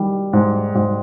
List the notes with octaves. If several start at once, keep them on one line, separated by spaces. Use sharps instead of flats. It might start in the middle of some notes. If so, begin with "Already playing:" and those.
Already playing: D#3 G3
G#2
G#2